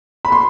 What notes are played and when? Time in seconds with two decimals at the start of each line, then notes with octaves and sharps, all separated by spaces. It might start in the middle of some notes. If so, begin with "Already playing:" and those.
0.25 B5
0.32 C6